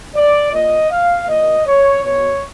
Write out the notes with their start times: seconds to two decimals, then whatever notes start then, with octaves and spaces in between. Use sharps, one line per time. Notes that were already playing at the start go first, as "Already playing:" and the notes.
0.15 D5
0.53 A#2 D#5
0.91 F5
1.28 A#2 D#5
1.66 C#5
2.03 B2 C#5